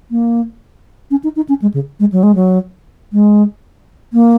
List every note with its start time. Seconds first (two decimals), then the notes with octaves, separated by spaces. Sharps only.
0.11 A#3
1.11 C#4
1.24 D#4
1.36 D#4
1.49 C#4
1.62 G#3
1.74 C#3
2.00 G#3
2.12 F#3
2.23 G#3
2.35 F#3
3.13 G#3
4.13 A#3